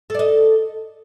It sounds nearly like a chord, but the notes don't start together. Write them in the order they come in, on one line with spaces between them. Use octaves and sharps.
A4 D5 D#5